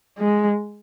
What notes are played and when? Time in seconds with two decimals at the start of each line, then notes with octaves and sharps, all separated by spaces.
0.18 G#3